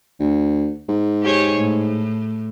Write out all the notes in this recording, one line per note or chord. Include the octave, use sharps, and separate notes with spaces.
D2
G#2
G4 G#4 C#5
A2